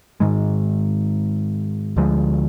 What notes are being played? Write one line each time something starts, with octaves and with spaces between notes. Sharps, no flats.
G#2 D#3 G#3
D2 D3 F3 G#3